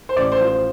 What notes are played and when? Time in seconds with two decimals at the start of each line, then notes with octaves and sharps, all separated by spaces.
0.09 C5
0.16 A1 D5
0.32 C5
0.40 F3
0.47 C5